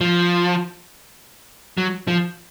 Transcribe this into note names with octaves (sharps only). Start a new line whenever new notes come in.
F3
F#3
F3